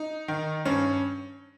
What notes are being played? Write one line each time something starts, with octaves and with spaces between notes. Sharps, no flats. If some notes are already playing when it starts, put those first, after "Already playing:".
Already playing: D#4
D#3
G2 C#4